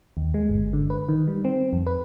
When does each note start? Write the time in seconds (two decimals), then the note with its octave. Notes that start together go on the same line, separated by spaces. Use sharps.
0.17 D#2
0.34 G#3
0.49 G1
0.73 D3
0.90 B4
1.09 D#3
1.28 G3
1.45 C4
1.73 F2
1.87 B4